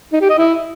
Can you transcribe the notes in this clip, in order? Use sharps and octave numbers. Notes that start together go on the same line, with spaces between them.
D#4
G4
D#5
E4